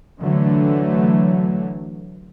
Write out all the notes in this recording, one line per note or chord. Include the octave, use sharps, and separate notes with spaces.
D3 E3 F#3 A3